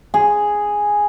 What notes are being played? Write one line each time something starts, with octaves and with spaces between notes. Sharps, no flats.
G#4